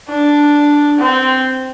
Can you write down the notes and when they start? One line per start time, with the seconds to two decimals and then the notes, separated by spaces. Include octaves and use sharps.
0.08 D4
0.99 C4